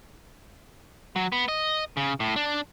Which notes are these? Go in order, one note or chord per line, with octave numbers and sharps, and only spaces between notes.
F#3
B3
D#5
C#3
A2
D4